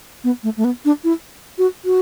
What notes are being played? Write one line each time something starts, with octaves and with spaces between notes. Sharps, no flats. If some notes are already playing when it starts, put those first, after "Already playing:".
B3
A3
A3
B3
D4
E4
F#4
F#4